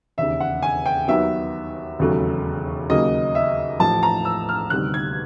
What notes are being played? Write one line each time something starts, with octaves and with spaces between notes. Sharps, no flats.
E1 D#2 C#3 E5
F#5
G#5
G5
D#2 D#3 F#3 B3 E5
E1 D#2 C#3 F#3 A3
D#2 C#3 F#3 A#3 D#5
E5
A1 A2 F3 A5
A#5
E6
F6
D2 C3 D#3 G3 B3 F#6
G#6